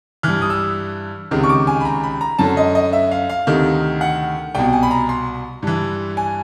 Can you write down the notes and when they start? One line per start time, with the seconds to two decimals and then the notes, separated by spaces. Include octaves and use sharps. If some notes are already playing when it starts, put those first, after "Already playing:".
0.23 G2 E3 F6
0.42 D#6
0.50 E6
1.31 C#2 C3 D#3
1.43 C#6
1.49 D6
1.67 G#5
1.81 B5
1.85 A#5
2.03 B5
2.21 A#5
2.39 F#2 D3 A5
2.57 D#5
2.75 D#5
2.93 E5
3.11 F5
3.29 F5
3.47 D2 C3 D#3
4.01 F#5
4.55 C2 B2 G5
4.73 G#5
4.83 B5
4.91 A#5
5.09 C6
5.63 G2 E3
6.17 G#5